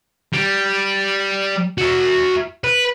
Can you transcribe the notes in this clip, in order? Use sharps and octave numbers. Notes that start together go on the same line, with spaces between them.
G3
F#4 E5
B4